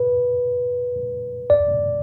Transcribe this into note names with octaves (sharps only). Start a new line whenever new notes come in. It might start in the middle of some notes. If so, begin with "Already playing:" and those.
Already playing: B4
D5